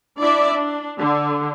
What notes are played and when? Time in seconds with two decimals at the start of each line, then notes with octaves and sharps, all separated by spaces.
0.21 D4 E4 D5 E5
0.53 D4
0.99 D3